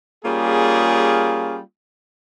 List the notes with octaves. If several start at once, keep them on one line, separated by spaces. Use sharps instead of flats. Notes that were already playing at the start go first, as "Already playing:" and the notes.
G3 A#3 C#4 F4 G#4